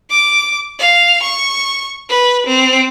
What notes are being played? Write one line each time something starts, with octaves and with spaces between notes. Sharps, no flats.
D6
F5
C#6
B4
C4